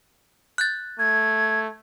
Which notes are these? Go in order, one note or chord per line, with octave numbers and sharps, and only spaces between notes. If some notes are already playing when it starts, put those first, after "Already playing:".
F#6 G6 A6
A3 G#6